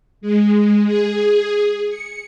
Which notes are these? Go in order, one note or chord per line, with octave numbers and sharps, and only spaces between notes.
G#3
G#4
C#7